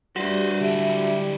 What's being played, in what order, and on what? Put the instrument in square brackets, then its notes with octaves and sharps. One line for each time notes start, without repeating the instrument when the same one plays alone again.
[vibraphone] G3 G4 D5 [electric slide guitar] D4 F#4 [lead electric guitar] B4 C5
[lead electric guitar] D3 E4 [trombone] G3 [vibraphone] E5